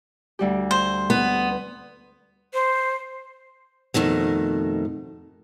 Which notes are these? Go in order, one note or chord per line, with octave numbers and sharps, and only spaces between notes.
D2 G3 G4
C5
B3
C5
F2 B2 D#3 A3